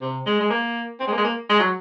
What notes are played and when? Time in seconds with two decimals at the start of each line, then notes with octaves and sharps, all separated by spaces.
0.01 C3
0.26 G#3
0.40 G#3
0.50 A#3
1.00 C4
1.07 G#3
1.12 A#3
1.18 G#3
1.24 A#3
1.49 G#3
1.59 F#3